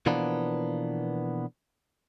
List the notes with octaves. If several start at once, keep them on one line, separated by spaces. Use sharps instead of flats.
B2 E3 F3 A#3 B3 D4